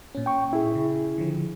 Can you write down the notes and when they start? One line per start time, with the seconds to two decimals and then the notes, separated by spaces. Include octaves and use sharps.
0.15 A#2 C#4
0.26 G5 C#6
0.53 E4 G#4
0.75 C#3
1.18 D3 F3